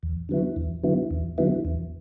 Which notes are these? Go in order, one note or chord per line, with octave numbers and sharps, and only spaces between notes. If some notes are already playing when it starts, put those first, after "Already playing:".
E2
D3 F#3 B3 E4
E2
D3 F#3 B3 E4
E2
D3 F#3 B3 E4
E2